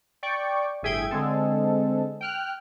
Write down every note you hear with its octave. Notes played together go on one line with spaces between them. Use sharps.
D5 G5 C#6
G1 A2 G#4 E5 G5 G#6
D3 G#3 C4 A4
G5 F6 F#6